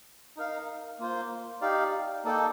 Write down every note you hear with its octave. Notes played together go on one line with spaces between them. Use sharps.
D#4 A#4 F5
A#3 F4 C5
D#4 G4 D5 F5
A#3 D#4 A4 D5 G5